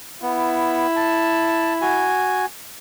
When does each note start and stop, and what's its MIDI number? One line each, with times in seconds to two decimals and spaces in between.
0.22 0.87 59
0.22 2.17 64
0.96 1.74 81
1.81 2.46 66
1.81 2.46 80